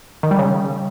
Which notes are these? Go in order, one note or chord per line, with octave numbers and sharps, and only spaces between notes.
D#3
G3
C#3